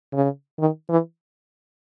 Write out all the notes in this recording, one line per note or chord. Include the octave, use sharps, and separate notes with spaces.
C#3
D#3
E3